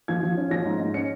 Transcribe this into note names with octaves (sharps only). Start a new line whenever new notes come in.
F3 G#6
F3
C#4
F3 A#6
G#2
G#2
C#4 C#7